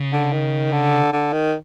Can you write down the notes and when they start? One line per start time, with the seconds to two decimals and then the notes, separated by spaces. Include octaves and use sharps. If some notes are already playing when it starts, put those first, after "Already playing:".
Already playing: C#3
0.12 D3
0.32 D#3
0.72 D3
1.12 D3
1.33 D#3